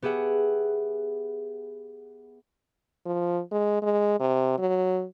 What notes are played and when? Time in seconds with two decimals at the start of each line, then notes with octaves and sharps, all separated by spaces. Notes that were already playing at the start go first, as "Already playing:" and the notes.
0.02 B3 G4 G#4 E5 F#5
3.06 F3
3.51 G#3
3.82 G#3
4.20 C3
4.58 F#3